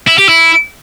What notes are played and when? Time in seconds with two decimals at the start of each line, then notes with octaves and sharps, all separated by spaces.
0.07 E4
0.18 G4
0.29 E4